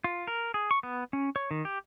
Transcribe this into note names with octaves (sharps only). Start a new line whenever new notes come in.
F4
A#4
G#4
C#6
B3
C#4
C#5
D#3
G4